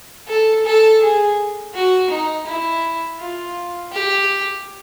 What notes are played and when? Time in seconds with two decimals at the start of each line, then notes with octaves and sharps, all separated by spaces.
0.28 A4
0.65 A4
1.00 G#4
1.74 F#4
2.10 D#4
2.47 E4
3.19 F4
3.92 G4